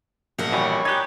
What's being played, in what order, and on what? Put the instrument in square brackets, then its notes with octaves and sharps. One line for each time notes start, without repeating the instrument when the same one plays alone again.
[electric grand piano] A#1 [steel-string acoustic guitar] A#4 F#5
[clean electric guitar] B2 E3 G3 [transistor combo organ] C#5 G#5 B5
[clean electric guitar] D#4 G4 [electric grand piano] F#6 G#6